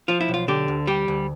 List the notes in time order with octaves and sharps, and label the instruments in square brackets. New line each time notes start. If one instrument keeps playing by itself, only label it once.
[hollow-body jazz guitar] F3 F4
E4
B1
F4
D3 G4
D2
G3 G4
D2